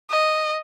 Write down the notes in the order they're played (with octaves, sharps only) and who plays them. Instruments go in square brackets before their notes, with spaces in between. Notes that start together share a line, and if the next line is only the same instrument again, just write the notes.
[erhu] D#5